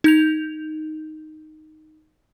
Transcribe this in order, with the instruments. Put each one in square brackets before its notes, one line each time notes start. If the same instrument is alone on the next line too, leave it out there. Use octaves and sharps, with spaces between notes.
[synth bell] D#4 G6 F7